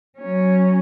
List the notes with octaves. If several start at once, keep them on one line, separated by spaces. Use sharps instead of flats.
F#3 C#4